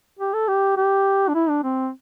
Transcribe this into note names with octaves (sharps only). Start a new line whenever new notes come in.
G4
A4
G4
G4
D4
E4
D4
C4